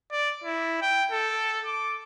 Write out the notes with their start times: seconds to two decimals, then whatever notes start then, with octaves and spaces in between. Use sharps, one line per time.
0.11 D5
0.44 E4
0.82 G5
1.12 A4
1.66 D6